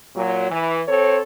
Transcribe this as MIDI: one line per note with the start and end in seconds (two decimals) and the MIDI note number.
0.15 0.48 46
0.15 0.48 54
0.49 0.81 52
0.87 1.19 60
0.87 1.19 69
0.87 1.19 72
0.87 1.19 73